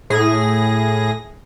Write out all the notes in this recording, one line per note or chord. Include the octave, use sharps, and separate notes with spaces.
A2 G#4 A#6